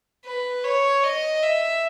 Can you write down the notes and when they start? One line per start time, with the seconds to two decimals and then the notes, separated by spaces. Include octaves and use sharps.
0.25 B4
0.64 C#5
1.03 D#5
1.43 E5